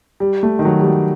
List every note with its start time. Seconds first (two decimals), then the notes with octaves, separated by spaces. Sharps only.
0.20 G3
0.43 A3
0.59 D#3
0.65 F#3
0.79 G3
0.87 F#3